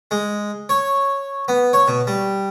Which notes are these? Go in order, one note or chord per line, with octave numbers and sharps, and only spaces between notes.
G#3
C#5
B3
C#5
B2
G3